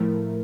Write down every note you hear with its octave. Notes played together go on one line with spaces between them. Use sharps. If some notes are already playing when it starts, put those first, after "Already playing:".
Already playing: A2 F3 A3 E4 A#4